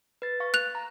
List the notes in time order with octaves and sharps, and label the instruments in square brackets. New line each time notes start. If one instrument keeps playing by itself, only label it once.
[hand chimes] B4 A6
F5 C#6 A6
[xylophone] F#6 F7
[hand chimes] A#5